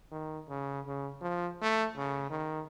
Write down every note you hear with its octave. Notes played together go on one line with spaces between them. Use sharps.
D#3
C#3
C#3
F3
A3
C#3
D#3